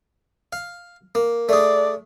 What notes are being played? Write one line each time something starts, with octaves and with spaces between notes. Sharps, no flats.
F5
A#3
A3 G#4 D5